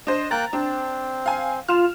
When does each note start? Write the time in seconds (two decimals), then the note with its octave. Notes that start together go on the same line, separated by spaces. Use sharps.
0.07 D4 C5 D#5
0.31 A#3 G5 A#5 F#6 A6
0.53 C4 D4
1.26 F5 G#5
1.68 F4 F6 E7